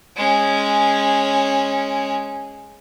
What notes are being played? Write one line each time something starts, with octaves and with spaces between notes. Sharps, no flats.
G#3 C#4